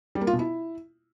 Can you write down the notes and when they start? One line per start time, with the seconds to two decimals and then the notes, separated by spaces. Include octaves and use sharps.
0.15 G3
0.21 A#3
0.27 F4
0.33 B2
0.39 E4